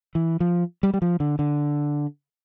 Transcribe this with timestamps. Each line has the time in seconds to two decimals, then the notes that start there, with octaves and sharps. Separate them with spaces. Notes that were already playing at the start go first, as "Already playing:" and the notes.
0.15 E3
0.40 F3
0.83 G3
0.94 G3
1.02 F3
1.20 D3
1.39 D3